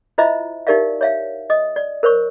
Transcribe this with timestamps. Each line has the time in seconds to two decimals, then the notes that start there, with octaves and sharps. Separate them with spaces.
0.18 E4 F4 C5 D#5 E5 A#5
0.67 D#4 G4 A#4 D5 E5 F5
1.01 C#5 E5 F5
1.50 D#5 D#6
1.76 D5
2.03 A#4 C5 C#5 C#6